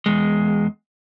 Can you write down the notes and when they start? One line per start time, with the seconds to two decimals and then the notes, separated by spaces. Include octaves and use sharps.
0.06 E2 G#3